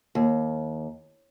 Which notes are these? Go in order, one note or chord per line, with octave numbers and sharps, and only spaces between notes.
D#2